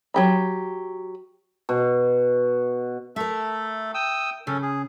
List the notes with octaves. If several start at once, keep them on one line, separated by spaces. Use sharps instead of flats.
F#3 G4 B5
B2
A3 A4 A#4 E5
G5 D#6 E6
C#3 C#4 A4
G#4